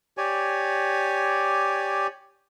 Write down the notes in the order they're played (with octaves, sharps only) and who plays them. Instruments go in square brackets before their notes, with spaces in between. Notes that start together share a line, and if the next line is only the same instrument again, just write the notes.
[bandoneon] G4 C#5 D5 G#5